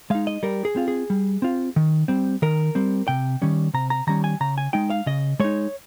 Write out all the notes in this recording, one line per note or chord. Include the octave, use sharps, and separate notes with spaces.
G#3 D#4 F5
D#5
G3 A#4
G#4
C4 F4
G#4
G3
C4 F4
D#3
G3 C4
D#3 A#4
G3 C4
C3 G5
D#3 G3 C#4
C3 A#5
A#5
D#3 G3 C#4 A#5
G#5
C#3 A#5
G#5
G#3 D#4 G5
F5
C#3 D#5
G#3 D#4 C#5